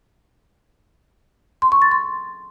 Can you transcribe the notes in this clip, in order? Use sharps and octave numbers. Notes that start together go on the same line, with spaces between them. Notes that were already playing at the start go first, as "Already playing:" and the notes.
C6
C#6
A6
C6